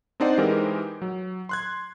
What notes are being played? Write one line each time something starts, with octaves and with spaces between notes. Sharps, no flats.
C4 D4 D#4 C5 D5 F#5
E3 G#3 D#4 G4 A#4 C5
F#3
C6 F#6 G#6